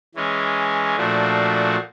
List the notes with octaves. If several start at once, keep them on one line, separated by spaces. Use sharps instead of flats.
E3 G#3 C#4
A#2 F3 A3 D4 F#4